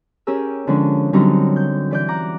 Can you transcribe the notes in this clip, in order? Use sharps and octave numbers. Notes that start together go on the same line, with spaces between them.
C#4 G4 G#4 A#4 E6
D3 F3 G#3 C#4 D4
D3 F#3 G3 C4 C#4 D#4
G6
E3 D5 G6
F#5 A#5 D6